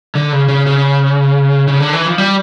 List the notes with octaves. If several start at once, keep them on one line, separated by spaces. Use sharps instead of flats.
D3
C#3
C#3
C#3
C#3
D3
E3
F3
G3